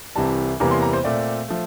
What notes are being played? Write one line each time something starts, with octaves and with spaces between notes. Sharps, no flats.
C2 C3 E3 G3 A5
E2 C3 E3 G3 A#3 A#5
C6
A#5
C5
A#2 A3 C4 D5
F3 A3